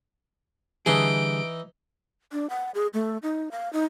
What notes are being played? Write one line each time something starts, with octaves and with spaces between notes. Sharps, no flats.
D3 E3 G3 D#4 G#4 D7
D4
F#5
G#4
A3
D#4
F5
D#4